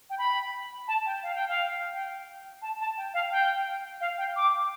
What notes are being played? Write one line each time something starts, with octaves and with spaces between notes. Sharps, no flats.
G5
B5
A5
G5
F5
G5
F5
G5
A5
A5
G5
F5
G5
F5
G5
D6